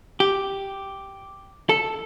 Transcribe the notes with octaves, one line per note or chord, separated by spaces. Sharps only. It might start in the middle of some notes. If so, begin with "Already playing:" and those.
G4
A4